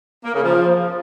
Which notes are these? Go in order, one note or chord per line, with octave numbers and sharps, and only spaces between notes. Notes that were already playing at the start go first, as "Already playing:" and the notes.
A#3
C#3
F3